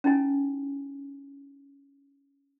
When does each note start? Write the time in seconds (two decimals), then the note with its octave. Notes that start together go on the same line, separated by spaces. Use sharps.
0.04 C#4 D#4 E4 G#5